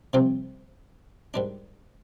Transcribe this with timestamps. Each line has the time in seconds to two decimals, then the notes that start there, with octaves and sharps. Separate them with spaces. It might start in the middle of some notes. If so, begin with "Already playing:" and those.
0.13 C2 C3 F3 C4 F4
1.34 G#2 D#3 G3 D4